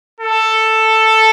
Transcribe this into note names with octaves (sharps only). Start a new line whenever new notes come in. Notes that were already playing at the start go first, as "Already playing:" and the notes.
A4